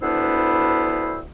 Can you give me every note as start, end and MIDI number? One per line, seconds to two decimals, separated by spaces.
0.01 1.19 38
0.01 1.19 59
0.01 1.19 62
0.01 1.19 64
0.01 1.19 72
0.01 1.19 88